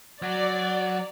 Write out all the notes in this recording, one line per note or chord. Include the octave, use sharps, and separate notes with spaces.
F#3 D5